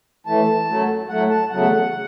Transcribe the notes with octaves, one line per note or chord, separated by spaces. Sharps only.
A2 E3 A3 A5
F#2 F#3 A3
A2 F#3 A3 F#5
A5
E2 C#3 F#3 A3 F#5